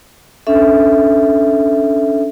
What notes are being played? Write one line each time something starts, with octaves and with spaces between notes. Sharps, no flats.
C#4 D4 A4 E5